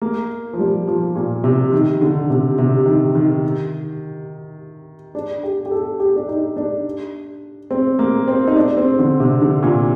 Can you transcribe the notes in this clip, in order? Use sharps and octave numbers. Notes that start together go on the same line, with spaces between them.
A#3
F3
G3
F3
A#2
C3
D#3
D3
C3
C3
D#3
D#3
D4
G4
G4
A4
G4
D4
D#4
D4
C4
A#3
C4
D#4
D4
C4
D3
C3
D3
A#2